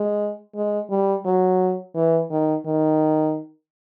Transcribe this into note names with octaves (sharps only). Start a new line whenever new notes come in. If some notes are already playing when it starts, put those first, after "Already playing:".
Already playing: G#3
G#3
G3
F#3
E3
D#3
D#3